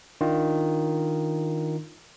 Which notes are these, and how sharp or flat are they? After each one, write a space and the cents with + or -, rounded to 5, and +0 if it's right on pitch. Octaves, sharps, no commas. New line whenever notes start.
D#3 +0 D4 +0 F4 +0